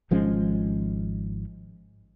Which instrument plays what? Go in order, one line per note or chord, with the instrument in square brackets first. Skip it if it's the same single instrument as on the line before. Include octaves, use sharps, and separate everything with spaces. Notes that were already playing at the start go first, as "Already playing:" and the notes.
[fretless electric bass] G#1 F3 G#3 C#4